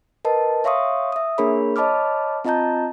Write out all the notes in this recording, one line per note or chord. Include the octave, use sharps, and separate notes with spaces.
A#4 B4 D#5 A5
C#5 E5 F5 C6 C#6 D#6
E5 D#6
A#3 D4 G#4 A#4 C#5 B5
C#5 D#5 A5 B5 D6 F6
C4 F4 D#5 A5 A#5 G6